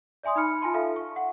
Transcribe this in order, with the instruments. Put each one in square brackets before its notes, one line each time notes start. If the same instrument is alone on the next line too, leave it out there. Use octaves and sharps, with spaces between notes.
[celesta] D5 E5 G#5 C6 D#6
D#4 B5 F6 C#7
F4 G#5 A5 C6
A4 E5 F5
C#6
F#5